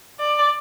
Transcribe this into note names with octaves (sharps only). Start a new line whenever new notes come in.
D5